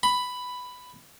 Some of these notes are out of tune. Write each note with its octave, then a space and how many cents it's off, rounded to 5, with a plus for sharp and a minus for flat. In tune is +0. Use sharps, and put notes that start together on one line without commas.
B5 +5